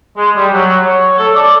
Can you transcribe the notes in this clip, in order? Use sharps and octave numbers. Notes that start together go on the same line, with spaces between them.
G#3
G3
F#3
C#5
A4
D5